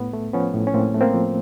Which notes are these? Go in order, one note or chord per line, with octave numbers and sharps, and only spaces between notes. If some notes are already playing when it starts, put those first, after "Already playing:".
Already playing: A2 B3
A3
F3 B3 C#4
A2
C#4
A2 A#3 C4
A3
A#3 C4
F3